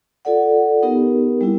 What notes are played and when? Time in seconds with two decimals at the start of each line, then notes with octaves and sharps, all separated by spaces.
0.25 F4 A4 D5 F#5
0.83 B3 D#4 G4 A#4
1.41 G3 C4 E4